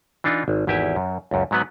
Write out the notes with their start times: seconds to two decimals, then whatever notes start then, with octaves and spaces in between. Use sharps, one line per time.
0.24 E3 D4 D#4 F4
0.48 G#1
0.67 G#1 E2 E4 G4 E5 G#5
0.96 F#2
1.31 C#2 F#2
1.51 G#2 F#3 B3 B4